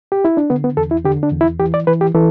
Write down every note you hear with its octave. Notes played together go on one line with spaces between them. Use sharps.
G4
E4
D4
D3 B3
B3
E2 A4
E4
D3 G4
D4
E2
E4
E3 G4
D5
E3 B4
G4
E3 A4